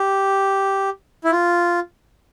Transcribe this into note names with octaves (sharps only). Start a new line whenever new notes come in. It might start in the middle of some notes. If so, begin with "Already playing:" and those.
Already playing: G4
E4
F4